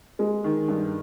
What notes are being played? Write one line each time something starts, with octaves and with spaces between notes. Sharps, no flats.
G#3
D#3
G2